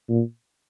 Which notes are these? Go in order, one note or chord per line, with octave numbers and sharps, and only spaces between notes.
A#2